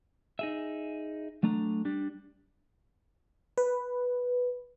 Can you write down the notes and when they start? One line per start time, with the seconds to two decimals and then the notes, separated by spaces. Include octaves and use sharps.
0.39 D#4 G#4 E5
1.43 F#3 A3 D4 A#5
1.85 G3 D4
3.58 B4